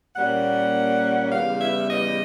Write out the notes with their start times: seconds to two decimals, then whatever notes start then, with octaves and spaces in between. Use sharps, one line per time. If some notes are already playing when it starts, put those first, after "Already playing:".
0.16 A#2 G3 A#3 C#4 F#5
1.31 E2 C#3 E3 G3 F5
1.60 E5
1.89 D#5